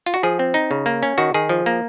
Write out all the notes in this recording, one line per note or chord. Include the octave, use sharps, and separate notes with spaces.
F4
F#4
F3 G#4
C4
D#4
C#3
A#3
C#4
D#3 F#4
D#3 G#4
F3
A#3